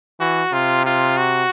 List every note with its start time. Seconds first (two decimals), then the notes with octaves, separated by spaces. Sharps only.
0.20 E3 F#4
0.53 C3 F4
0.86 F4
1.18 F#4